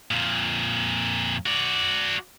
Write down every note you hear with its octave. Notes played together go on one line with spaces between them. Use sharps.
F2 A#2
F#4 D5